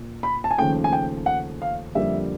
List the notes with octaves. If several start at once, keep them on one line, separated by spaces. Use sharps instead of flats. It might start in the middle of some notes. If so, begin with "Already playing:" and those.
Already playing: A#2
B5
A5
G#5
D#2 C#3 F3 A3 C#4 G5
G#5
G5
F#5
F5
F2 D3 G3 A#3 E5